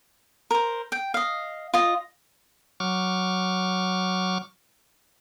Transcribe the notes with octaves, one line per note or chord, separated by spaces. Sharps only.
A#4 C5
G5
D#5 F5
F4 D#5
F#3 C#6 D6 F6